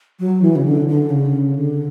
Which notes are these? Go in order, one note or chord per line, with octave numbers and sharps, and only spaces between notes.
F#3
E3
C#3
D3
D3
C#3
D3